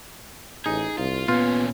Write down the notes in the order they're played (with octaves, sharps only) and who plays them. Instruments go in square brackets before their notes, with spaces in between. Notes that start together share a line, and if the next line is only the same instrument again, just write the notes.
[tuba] A1 [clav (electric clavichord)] D#4 [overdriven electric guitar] G#4
[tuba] C2 [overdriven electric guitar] F4
[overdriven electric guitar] A#2 C#4 [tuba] B3 [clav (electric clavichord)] F4